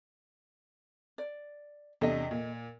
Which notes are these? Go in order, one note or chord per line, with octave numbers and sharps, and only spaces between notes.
D5
E2 C3 D4 A4 D#5
A#2